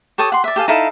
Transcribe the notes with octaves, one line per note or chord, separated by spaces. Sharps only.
G4 A4 C#5 D#6
F#5 C6
D5 E5
G4 A4 F5 G#5
D#4 E4 A4 F5